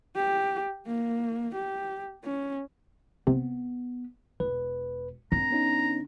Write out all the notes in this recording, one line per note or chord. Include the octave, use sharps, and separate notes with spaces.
G4
A#3
G4
C#4
C3 B3
E1 B4
D3 C4 D4 A#5
B3 C#4 D#4